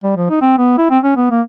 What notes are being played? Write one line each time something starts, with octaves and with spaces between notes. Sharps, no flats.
G3
F3
D#4
C4
B3
E4
C4
C#4
B3
A#3